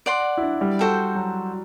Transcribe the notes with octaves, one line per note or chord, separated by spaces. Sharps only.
D5 F#5 C6
E4
D4
G3
F#4 A4 C5 G5
F#3